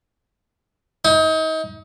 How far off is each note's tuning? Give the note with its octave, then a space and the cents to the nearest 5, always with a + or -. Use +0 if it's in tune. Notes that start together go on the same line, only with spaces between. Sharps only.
D#4 +35